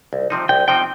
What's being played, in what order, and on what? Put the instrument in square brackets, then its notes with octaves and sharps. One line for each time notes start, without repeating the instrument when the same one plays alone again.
[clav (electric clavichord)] C2
C3 F3 C4 D#4
[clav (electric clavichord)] C2 [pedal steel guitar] G5
[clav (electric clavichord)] C3 F3 C4 D#4 [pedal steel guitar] G5